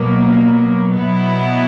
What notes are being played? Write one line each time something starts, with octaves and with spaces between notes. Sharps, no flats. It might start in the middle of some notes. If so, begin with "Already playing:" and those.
Already playing: B2 F#3 A#3
B2 F#3 B3 E4